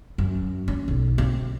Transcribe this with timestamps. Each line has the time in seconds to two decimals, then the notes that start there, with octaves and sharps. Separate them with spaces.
0.18 F#2
0.68 C#4
0.88 B1
1.18 C4